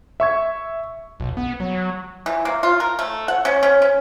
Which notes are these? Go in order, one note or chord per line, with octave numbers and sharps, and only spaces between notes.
E5 C#6 G#6
B1
B3
F#3
E3
A#3
F4
A#4
A3
F#5
C#4
C#4
C#4